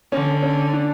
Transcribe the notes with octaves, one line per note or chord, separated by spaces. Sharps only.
D3 C#4
C#4
D4